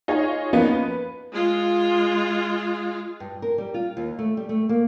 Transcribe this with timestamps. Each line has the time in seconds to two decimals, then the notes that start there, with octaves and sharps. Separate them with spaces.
0.08 D#4 F4 G#4 C#5
0.53 F3 A#3 B3 C#4 D#4
0.72 B4
1.32 G#3 F4
3.20 G2
3.42 A#4
3.58 G3
3.74 F4
3.97 D#2
4.19 A3
4.37 G3
4.49 A3
4.69 A#3